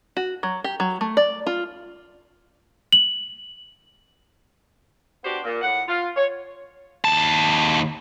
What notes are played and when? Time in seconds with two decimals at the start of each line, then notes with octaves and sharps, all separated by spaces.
0.17 F#4
0.43 F#3
0.64 G4
0.80 F#3
1.01 A3
1.17 D5
1.47 F4
2.92 F#7
5.23 B3 D4 F#4 G4 C5
5.44 A#2
5.61 A2 F#5
5.87 F4
6.15 C#5
7.04 D#2 A5